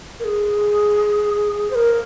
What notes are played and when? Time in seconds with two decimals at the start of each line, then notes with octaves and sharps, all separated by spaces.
0.20 A#4
0.24 G#4
1.71 C5
1.75 A#4